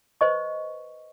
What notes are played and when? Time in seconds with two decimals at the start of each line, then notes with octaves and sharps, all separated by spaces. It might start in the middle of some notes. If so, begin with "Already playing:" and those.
0.21 B4 C5 D#5 C#6